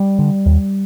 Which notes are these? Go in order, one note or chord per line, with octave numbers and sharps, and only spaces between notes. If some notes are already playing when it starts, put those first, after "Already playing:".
Already playing: G3
D3
D#2